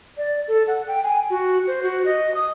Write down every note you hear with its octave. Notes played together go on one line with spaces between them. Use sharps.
D5
A4
F#5
G5
G#5
F#4
C5
F#4
D#5
D#6